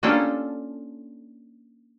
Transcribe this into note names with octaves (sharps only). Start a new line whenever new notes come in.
A#3 C#4 D4 F4 G4 A4